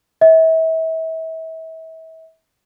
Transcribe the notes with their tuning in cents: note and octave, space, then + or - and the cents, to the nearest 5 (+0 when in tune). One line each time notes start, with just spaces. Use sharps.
E5 -35